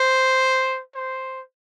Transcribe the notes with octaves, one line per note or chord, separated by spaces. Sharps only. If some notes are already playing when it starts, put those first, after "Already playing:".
Already playing: C5
C5